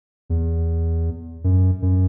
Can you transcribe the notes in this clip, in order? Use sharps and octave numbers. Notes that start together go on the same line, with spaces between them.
E2
F#2
F#2